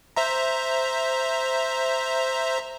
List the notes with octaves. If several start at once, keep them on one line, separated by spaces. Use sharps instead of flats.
C5 E5 A#5